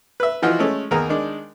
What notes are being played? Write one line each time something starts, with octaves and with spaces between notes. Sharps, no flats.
B4 E5
E3 F3 D#4 F4 F#4
G#3 A3 C#4
D#2 A#3 B3 G#4 A#4 A#5
D#3 G#3 D4